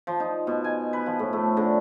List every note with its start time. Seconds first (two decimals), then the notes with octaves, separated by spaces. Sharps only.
0.07 F3
0.20 D#4
0.47 B2
0.64 G#5
0.93 B4
1.06 F3
1.19 A2
1.33 A3
1.57 D3